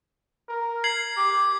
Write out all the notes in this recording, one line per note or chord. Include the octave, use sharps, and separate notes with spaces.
A#4
G#6 C7 F#7
G4 D6